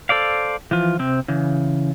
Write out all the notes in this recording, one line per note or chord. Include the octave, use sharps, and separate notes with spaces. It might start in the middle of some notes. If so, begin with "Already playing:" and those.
A4 C5 D5 F5
E3 F3 F4
C3 C4
C#3 E3